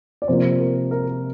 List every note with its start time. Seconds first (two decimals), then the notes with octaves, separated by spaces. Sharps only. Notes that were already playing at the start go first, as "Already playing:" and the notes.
0.22 D5
0.28 C3 F3 A#3 C5
0.60 A#4
0.91 A#4